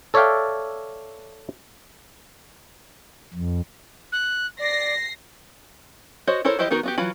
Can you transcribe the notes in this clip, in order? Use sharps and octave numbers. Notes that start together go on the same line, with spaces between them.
A4 C#5 D5 E5 F5 G5
F2
F#6
D5 A#6 C7
F#4 C5 C#5 D#5
E4 A4 A#4 C5 C#5
E3 E4 G4 C5 D#5
D#3 B3 D#4 F#4 A#4
B3 F#4 G4
E3 F#3 F4 B5